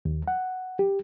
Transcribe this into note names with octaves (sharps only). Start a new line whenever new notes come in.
D#2
F#5
G4